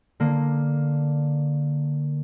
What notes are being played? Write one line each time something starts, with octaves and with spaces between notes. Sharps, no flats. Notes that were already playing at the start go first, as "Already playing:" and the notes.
D3 A#3